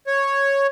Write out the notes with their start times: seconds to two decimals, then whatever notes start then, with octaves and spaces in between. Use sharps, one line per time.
0.07 C#5